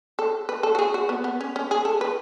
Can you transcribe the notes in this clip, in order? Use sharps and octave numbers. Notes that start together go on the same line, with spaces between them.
A4
B4
A4
F#4
G#4
F#4
B3
B3
C#4
C#4
G#4
A4
B4